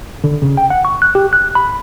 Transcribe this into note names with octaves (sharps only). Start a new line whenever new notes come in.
D3
C#3
G5
F#5
C#6
F#6
G4
F#6
B5